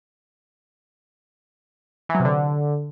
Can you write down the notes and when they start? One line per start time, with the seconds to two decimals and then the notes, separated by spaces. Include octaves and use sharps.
2.09 E3
2.15 F#3
2.20 C3
2.25 D3